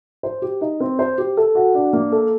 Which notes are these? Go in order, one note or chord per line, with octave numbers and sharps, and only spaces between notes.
C5
G4
D#4
C4
C5
G4
A4
F#4
D4
A#3
A4